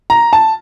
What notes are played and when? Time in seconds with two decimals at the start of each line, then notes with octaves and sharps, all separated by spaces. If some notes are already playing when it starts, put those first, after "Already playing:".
0.10 A#5
0.33 A5